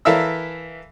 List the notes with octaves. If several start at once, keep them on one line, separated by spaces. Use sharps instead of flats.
E3 A4 A#4 E5 F5 E6